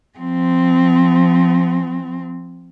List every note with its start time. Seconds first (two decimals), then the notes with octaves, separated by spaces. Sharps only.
0.18 F3 C4